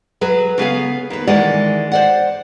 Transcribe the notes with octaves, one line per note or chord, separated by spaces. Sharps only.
F#3 G#4 B4
C#3 B3 G#4 F5
D#2 B4
D#3 E3 G#3 D5 F#5
C5 D5 F#5